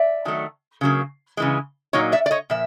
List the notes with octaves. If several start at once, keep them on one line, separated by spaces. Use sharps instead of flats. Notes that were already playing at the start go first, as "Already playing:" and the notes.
Already playing: D5 E5
D#3 F#3 A3
C#3 F#3 A#3
C#3 E3 G#3
A#2 F#3 A#3 D#4 C#5 D#5
D5 E5
D5
C#5 D#5
A#2 F3 E5